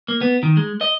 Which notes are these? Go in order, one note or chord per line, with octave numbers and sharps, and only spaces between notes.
A#3
B3
D#3
G#3
D#5